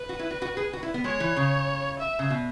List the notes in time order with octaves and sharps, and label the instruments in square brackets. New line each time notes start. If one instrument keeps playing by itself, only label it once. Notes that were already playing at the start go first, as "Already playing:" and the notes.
Already playing: [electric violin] B4
[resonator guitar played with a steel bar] F#4
E4
F#4
F#4
G#4
F#4
E4
B3
[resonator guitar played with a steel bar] G#3 [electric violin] C#5
[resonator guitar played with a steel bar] E3
C#3
[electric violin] E5
[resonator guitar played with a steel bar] C#3
B2